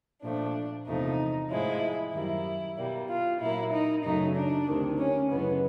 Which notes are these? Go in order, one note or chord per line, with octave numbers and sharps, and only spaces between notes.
A#2 F3 A3 D4
E2 C3 F3 A3 D#4
A2 F3 G#3 E4
F#2 D#3 G3 A#3 E4
B2 G3 A#3
F4
A#2 F#3 A#3 E4
D#4
F#2 C#3 F#3 A3 D#4
D4
D2 C3 D#3
C#4
F#2 C#3 E3 G#3 B3